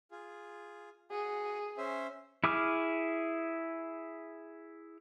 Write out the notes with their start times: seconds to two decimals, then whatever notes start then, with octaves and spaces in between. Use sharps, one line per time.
0.11 F4 G#4
1.11 F#4 G#4
1.78 C#4 C5 E5
2.44 E4 G#4 D6 F6